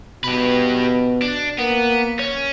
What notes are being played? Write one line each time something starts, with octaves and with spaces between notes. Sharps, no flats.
B2 G4 B4
D4
A#3 B3
C#4